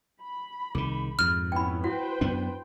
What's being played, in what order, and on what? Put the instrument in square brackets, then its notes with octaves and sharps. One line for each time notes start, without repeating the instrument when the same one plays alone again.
[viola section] B5
[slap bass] C2 D#3 [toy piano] G#4
[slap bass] F2 G#2 [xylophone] F6
[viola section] B3 C#4 E4 [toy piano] G5 B5
[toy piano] E4 F#4 F#5 [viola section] B4 C5 G5
[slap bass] F#2 B3 D4